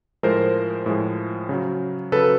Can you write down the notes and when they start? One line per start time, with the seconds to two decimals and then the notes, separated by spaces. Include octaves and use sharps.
0.23 A2 F3 G#3 A#4 C5
0.86 A2 F3 G#3
1.49 C#3 F#3
2.12 C#3 F#3 A4 B4